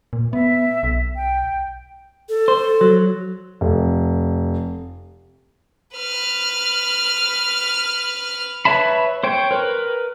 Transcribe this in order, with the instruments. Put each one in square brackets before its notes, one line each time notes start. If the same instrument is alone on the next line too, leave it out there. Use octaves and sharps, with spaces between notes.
[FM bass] A#2
[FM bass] B3 [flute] E5
[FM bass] B1
[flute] G5
[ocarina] A4
[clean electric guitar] C5
F#3
[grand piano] F1
[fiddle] B4 F6
[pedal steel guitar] B4 C#5 E5 A5 B5
C5 C#5 G5
A#4 B4